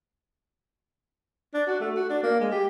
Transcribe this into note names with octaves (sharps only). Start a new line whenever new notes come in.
D4
F#4
A3
F#4
D4
A#3
G#3
G4